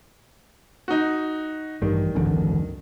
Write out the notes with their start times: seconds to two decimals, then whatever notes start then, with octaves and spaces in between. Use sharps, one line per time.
0.88 D#4 F#4
1.82 A1 G2 D#3 G3
2.15 G#1 C#2 F#2 D3 E3 C#4